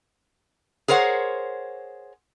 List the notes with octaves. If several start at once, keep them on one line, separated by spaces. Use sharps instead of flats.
G#4 A#4 C5 C#5 F#5